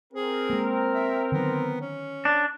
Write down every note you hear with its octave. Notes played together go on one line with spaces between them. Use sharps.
C4 G#4 A#4
G#3 A#3
E5
D3 D#3 F#3 B3
C#4
D4